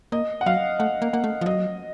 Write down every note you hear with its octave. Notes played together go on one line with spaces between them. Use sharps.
A#3 D#5
F#5
F#3 F5
A3 F#5
A#3
A#3 F#5
A3
F3
F#3 D#5